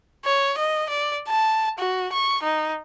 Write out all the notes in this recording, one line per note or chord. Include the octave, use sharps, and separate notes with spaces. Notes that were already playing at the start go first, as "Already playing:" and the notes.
C#5
D#5
D5
A5
F#4
C#6
D#4